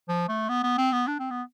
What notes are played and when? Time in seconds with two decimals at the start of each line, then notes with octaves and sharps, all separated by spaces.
0.08 F3
0.28 A3
0.49 B3
0.63 B3
0.78 C4
0.92 B3
1.07 D4
1.19 C4
1.30 B3